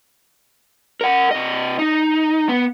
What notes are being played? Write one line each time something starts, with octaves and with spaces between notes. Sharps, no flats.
A#4 F#5
C3 D#5
D#4
B3